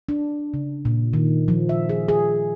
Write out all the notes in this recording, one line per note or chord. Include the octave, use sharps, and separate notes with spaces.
D4
C#3
A#2
D#3
F3
E5
G#4
G#4